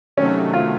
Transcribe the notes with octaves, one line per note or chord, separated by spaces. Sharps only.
C3 D#3 F#3 A3 C#4
F4